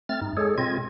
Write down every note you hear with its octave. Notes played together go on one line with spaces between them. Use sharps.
A3 C4 F6 A6
G2 D#4
G#3 G#4 A4 C#5
B2 C4 F4 D#5 G#6